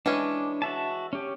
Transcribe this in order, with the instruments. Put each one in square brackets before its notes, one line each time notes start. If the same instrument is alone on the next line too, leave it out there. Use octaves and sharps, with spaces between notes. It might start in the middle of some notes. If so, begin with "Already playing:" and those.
[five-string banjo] E3 G#3 C#4 [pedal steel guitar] D4
[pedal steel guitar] F#4 E5 A5
C#4 G4